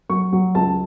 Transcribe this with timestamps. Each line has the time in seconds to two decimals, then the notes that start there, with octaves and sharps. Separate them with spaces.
0.09 F#3 C#6
0.33 F#3
0.55 C#2 A5